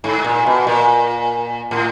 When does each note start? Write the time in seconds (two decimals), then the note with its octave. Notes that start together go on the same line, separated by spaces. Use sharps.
0.04 G#2
0.24 A#2
0.46 B2
0.67 A#2
1.71 A2